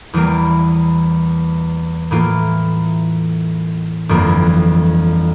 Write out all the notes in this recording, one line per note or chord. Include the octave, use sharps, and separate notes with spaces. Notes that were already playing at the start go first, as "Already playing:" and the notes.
E2 E3 G3 A#3
A2 E3 A#3 F4
G1 F2 E3 A#3